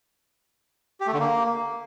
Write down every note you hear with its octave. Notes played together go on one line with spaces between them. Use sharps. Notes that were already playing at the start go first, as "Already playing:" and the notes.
G4
A3
D3
A#3